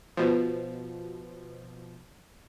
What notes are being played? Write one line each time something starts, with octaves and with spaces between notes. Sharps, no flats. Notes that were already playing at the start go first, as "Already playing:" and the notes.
B2 F3